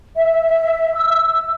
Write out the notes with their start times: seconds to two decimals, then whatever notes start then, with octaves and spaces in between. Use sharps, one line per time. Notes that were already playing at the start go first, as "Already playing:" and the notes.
0.16 E5
0.94 E6